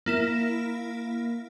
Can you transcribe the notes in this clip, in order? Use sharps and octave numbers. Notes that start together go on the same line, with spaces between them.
A#3 E4 A#6